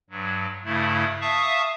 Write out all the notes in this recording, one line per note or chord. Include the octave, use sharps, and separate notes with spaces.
G2 F#3
G2 C#3 A3 E4
E5 F5 A5 C#6 D#6